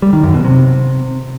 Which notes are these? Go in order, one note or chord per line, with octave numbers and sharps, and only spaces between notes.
G3
D#3
F#2
B2
C3